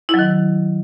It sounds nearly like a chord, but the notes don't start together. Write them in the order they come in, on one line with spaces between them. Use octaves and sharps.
E4 F#3 D#3